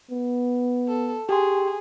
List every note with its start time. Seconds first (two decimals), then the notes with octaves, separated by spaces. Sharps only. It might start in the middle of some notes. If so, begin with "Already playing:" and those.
0.11 B3
0.88 A4
1.29 G4 G#4 G5 C6